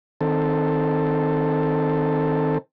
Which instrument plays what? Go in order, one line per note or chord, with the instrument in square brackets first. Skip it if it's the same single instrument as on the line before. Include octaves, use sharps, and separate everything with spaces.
[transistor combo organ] D#3 C4 A4